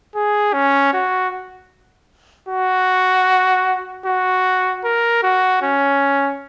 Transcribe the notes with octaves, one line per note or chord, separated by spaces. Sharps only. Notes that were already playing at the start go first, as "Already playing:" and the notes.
G#4
C#4
F#4
F#4
F#4
A#4
F#4
C#4